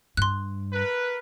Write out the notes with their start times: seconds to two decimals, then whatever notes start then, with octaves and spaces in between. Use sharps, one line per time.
0.17 G2 C6 F#6
0.73 A#4 B4